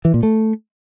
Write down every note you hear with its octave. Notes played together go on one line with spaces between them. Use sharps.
E3
A#2
A3